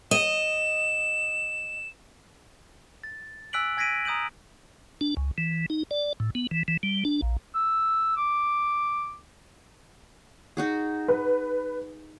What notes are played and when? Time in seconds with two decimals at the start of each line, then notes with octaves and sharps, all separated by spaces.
0.11 D#5 E7
3.04 A6
3.53 G#5 E6 F#6 B6 D7 F#7
3.77 G#5 G#6 A#6 B6 D7 D#7
4.05 A#5 D#6 G6 D#7 F#7
5.01 D4
5.17 C#2
5.38 E3
5.70 D#4
5.91 D5
6.20 A2
6.35 B3
6.51 E3
6.68 E3
6.83 G3
7.05 D4
7.22 A#1
7.55 E6
8.17 D6
10.57 D#4 F#4 G#4
11.08 B4